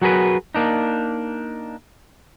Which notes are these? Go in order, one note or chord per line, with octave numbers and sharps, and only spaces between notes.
F#3 F#4 G#4 A#4 B4
A#3 D4 D#4